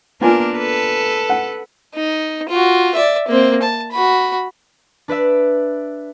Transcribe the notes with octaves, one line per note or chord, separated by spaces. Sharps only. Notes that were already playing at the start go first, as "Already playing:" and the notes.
A#3 B3 D4 F4 A#4 G#5
A4 B4
F#5
D#4
F4 F#4
D5 E5
A#3 C4
A5
F#4 B5
D4 B4 D5 E5